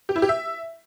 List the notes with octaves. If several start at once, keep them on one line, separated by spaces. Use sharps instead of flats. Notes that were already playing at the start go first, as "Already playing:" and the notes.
G4
E4
G4
E5